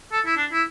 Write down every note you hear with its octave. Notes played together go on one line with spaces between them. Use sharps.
A4
E4
D4
E4